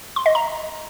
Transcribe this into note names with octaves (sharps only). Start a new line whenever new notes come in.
C6
D#5
A#5